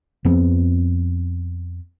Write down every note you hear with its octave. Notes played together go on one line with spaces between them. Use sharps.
F2 F3 B3 C4